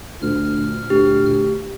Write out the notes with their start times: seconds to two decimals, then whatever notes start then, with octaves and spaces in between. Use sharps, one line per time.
0.22 D2 A#2 F6
0.90 D2 G4